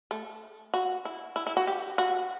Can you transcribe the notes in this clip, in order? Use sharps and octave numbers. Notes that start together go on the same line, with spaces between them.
A3
F#4
E4
E4
E4
F#4
G4
F#4